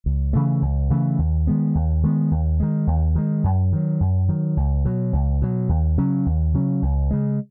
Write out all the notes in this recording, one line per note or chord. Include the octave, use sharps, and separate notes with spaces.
C#2
C#3 E3 A3
C#2
C#3 E3 A3
D#2
D#3 G#3 B3
D#2
D#3 G#3 B3
D#2
D#3 G#3
D#2
D#3 G#3
F#2
D#3 F#3
F#2
D#3 F#3
C#2
B2 F#3
C#2
B2 F#3
D#2
C#3 F#3 C#4
D#2
C#3 F#3 C#4
C#2
C#3 G#3